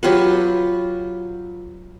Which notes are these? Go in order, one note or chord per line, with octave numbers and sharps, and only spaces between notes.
F#3 F4 G4 B4